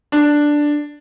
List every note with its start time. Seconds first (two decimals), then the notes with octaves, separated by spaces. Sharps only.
0.12 D4